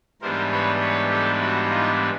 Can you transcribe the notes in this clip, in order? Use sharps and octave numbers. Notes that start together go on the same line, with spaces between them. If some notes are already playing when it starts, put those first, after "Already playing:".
G#2 E3 G3 B3 D4 A#4 C5
B4 C#5
B4 C#5
G4 A4
E4 F#4
D#4 F4